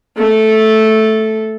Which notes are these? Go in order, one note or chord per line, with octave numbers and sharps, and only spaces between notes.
A3 A4